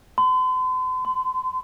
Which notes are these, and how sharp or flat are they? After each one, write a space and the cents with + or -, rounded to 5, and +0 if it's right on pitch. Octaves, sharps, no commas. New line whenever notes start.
C6 -45
C6 -25